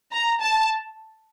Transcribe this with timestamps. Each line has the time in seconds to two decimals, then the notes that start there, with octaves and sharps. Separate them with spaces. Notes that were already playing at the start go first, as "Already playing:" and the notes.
0.12 A#5
0.41 A5